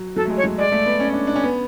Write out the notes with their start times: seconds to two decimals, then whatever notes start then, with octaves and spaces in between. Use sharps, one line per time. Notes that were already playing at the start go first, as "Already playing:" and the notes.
Already playing: F#3
0.16 F#3 A4
0.25 A3
0.30 G#3
0.37 C#5
0.44 F#3
0.58 G#3 D5
0.72 A3
0.86 B3
1.00 C#4
1.13 D4
1.27 D4
1.36 C#4
1.44 B3